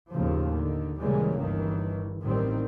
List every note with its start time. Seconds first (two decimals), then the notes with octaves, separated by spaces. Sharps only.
0.10 D#2 A2 C#3 F3
0.56 D3 D#3
1.00 A#2 C#3 E3 G3 G#3 A#3
1.39 G1 C#2 G2 D#3 E3
2.23 A1 D#3 G3 C4